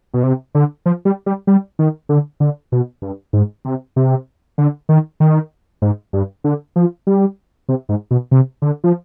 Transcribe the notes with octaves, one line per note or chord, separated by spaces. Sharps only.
B2
C3
D3
F3
G3
G3
G3
D#3
D3
D3
B2
G2
G#2
C3
C3
D3
D#3
D#3
G#2
G2
D3
F3
G3
C3
G#2
B2
C3
D3
F3